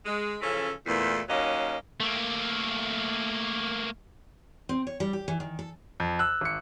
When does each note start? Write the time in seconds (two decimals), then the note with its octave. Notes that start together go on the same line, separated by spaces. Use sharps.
0.05 G#3
0.41 C#3 E3 F3 C#4 A4
0.86 E2 A#2 A3
1.28 D#2 D#3 F#3 A#3 C#4 D#5
2.00 A3 A#3
4.69 C4
4.87 C#5
5.00 G3
5.13 G4
5.28 E3
5.40 D#3
5.59 A4
6.00 F2
6.19 E6 F#6
6.41 G#1 C#7